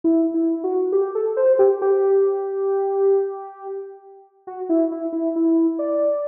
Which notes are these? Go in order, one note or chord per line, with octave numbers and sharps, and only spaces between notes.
E4
E4
F#4
G4
A4
C5
G4
G4
F#4
E4
E4
E4
E4
D5